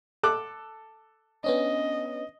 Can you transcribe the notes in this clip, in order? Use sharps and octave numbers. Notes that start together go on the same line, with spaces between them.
A4 D6 F#6
B3 C#4 D4 D#5